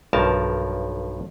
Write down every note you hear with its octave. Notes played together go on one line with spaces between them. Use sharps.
B1 G2 F3 A#4 A5